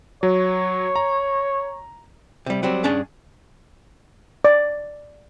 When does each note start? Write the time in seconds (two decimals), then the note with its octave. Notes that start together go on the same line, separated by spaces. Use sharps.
0.23 F#3 C#5
0.96 A#5
2.46 C3 G3
2.63 F#3 G3 C4
2.84 G2 C#4 D4 G#4 A5
4.44 D5